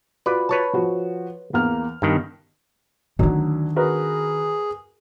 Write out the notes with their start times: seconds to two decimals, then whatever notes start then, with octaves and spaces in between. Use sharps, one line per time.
0.26 F4 F#4 B4 D5
0.49 B4 C#5 A5
0.73 F3 F#4
1.53 E2 A#3 F6
2.02 G2 D#3 B3
3.19 D2 D#3 F#3 D4
3.76 F#4 G#4 A#4 B4